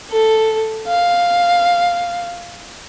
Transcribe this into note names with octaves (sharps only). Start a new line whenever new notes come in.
A4
F5